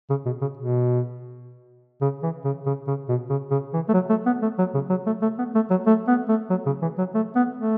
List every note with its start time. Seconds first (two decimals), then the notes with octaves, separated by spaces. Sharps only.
0.10 C#3
0.25 B2
0.41 C#3
0.57 B2
2.01 C#3
2.23 E3
2.45 C#3
2.66 C#3
2.87 C#3
3.09 B2
3.29 C#3
3.51 C#3
3.73 E3
3.89 A3
3.94 F#3
4.10 A3
4.26 B3
4.42 A3
4.58 F#3
4.74 C#3
4.90 F#3
5.06 A3
5.22 A3
5.38 B3
5.55 A3
5.70 F#3
5.86 A3
6.08 B3
6.29 A3
6.50 F#3
6.66 C#3
6.82 E3
6.98 F#3
7.14 A3
7.36 B3
7.57 A3